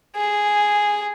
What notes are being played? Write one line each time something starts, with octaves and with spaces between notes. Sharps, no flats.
G#4